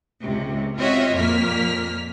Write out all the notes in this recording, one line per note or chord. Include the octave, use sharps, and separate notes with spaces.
C#2 C3
C4 F4 F#4 C#5 D#5 E5
F2 A#2 A#3 F6 B6